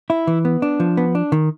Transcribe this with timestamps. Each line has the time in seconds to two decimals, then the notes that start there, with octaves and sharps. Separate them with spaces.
0.10 E4
0.27 E3
0.45 B3
0.62 D4
0.80 F3
0.97 B3
1.15 D4
1.32 D#3